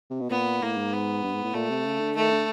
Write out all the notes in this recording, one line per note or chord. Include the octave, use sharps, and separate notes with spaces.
C3
B2
A#2 B3
A2 A#3
G#2
B3
G2
G#2
A2
A#2 A3
C3
C#3
D3
D#3 A3
D3